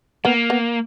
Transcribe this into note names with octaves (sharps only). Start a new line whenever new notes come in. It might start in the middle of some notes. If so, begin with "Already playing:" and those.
A#3 B3
B3